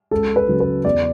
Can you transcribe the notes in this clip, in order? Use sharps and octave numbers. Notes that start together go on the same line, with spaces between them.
C#2 A4
B4
C#3 F#3
B4
E2 D5